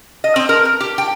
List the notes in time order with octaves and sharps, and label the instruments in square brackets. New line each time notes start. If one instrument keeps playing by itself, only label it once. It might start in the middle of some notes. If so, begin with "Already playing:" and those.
[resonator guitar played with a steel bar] D#5
C4
A#4
A#4
G4
G5